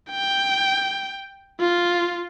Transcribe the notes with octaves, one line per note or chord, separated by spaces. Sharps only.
G5
F4